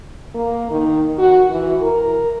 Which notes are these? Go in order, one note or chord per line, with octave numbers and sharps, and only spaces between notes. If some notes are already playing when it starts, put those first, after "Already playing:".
A#3
D#3
F#4
E3
A#4